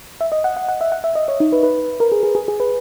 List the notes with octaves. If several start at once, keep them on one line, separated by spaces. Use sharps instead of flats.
E5
D#5
F#5
F#5
F#5
E5
F#5
E5
D#5
C#5
D#4
B4
B4
A#4
G#4
G#4
G#4
G#4
B4